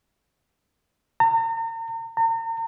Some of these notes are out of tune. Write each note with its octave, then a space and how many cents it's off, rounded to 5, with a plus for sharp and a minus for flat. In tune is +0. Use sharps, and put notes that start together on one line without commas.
A#5 -40
A#5 -40